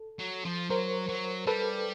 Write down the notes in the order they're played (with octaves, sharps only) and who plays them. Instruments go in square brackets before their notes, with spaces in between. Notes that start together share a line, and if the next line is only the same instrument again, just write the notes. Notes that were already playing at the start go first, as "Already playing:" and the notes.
Already playing: [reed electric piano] A4
[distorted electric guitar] F#3
F3
[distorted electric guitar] F#3 [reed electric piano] A#4 C5
[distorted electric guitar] F#3
[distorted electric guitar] G3 [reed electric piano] A4 B4